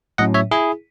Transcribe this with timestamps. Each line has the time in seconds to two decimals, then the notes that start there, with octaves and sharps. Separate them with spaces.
0.18 A2 F#3 C#4 D#5 F#5
0.34 C#5 E5
0.51 E4 G#4